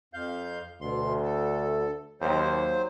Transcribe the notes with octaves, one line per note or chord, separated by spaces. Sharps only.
F2 F5 G6
D2 B2 C6
A4
D#2 F#3 C5